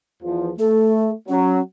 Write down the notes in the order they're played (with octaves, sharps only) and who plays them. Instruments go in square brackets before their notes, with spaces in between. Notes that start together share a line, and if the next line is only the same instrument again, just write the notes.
[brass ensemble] E2 F3
[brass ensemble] A3 [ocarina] A4
[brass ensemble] F#3 [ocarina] C#4